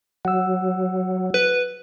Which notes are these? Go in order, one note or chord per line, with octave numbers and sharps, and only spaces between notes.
F#3 F#5 E6
B4